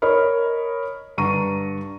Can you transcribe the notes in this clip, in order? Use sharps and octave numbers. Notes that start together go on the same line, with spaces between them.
A#4 C#5 D#5 B5 F6
G2 D3 D4 A#5 C#6 D#7